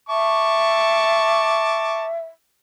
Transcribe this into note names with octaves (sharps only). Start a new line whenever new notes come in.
E5 A5 C#6 D6